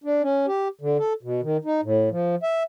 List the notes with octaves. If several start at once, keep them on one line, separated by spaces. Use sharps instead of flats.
D4
C#4
G4
D3
A4
B2
D#3
D#4
A2
F3
E5